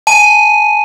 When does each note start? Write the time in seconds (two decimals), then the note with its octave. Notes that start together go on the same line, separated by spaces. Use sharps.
0.07 G#5 A5 D#7